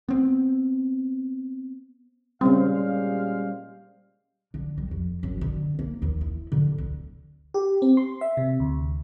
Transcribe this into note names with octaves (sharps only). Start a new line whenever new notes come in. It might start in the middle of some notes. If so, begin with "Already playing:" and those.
B3 C4
A#2 C#3 G3 G#3 C4 C#4 C5 F5
D3
G3
F2
F#1
D3
A#3
D#2
E4
D3
D2
G4
C4
C6
E5
C3
D2